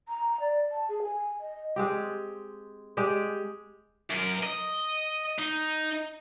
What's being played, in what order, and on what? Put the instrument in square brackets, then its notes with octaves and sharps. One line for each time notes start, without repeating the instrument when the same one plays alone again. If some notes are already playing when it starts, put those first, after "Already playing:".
[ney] A#5
D5
A5
G#4
G#5
D#5
[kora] G#3 C4 G4
G#3 G4 G5
[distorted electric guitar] F#2 A#4
D#5
D#4